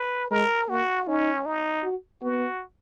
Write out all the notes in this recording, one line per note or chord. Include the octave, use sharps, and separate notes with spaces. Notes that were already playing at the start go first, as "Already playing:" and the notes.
Already playing: B4
G#3 A#4
A#3 F#4
C#4 D#4
D#4
F#4
B3 F#4